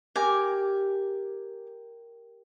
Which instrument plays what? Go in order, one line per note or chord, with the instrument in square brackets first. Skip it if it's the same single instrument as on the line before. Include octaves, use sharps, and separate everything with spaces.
[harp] G4 A#4 [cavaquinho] G#5 D6